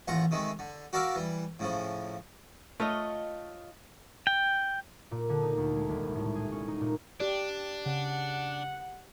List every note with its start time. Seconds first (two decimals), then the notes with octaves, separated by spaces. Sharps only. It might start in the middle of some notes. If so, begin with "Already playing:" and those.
0.08 A1 D#2 F4 F#5 A#5
0.31 C3 D#3 G#3 A3
0.59 D3
0.93 F#4 A#4 D5 E5 F5
1.15 E3 G3
1.59 A2 C#3 F3
2.80 A3 F4 C#5 D#5
4.27 G5
5.11 A#2
5.29 D3
5.42 D#4
5.57 D2
5.76 G#3
5.89 D#1
6.03 C2
6.15 A2
6.35 G#4
6.52 C#4
6.68 D#4
6.81 A#2
7.20 D4 G4 D5
7.86 C#3 F#5